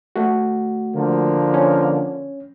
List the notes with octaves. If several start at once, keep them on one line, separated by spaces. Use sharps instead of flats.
A3 F#4
D3 F3 A#3
C#4